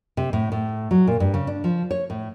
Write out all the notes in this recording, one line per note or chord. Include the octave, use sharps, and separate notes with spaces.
C3
A2
A2
F#3
A#2
G2
C#3
D4
F3
C#5
A2